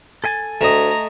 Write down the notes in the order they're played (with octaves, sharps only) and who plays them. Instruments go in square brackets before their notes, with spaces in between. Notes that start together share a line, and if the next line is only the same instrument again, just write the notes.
[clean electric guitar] A4 G#5 A5
[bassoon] D2 [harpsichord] A3 D#5 [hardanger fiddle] A#5